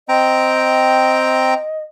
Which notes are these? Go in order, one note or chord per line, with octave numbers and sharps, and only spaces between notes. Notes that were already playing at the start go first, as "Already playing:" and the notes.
C4 D#5 G5 A#5